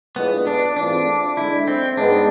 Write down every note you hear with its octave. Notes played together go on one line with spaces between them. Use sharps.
A2 G#3 B3 D4 F4 B4
D4
G#2 E3 A3 C4 D4 F4
D3 G#3 D4 E4
C4
G#2 G#3 B3 D4